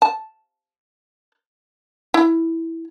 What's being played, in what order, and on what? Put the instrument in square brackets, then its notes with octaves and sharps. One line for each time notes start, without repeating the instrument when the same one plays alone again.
[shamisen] A5
E4